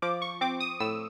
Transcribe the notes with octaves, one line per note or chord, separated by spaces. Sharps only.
F3 D6
C#6
C4 D6
D#6
A2 E6